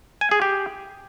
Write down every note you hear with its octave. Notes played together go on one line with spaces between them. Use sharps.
G#5
G#4
G4